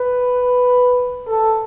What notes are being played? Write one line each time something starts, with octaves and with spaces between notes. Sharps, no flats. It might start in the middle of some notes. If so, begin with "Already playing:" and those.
Already playing: B4
A4